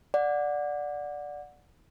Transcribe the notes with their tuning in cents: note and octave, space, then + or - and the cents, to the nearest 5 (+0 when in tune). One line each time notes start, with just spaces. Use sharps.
D5 +0 F#5 -20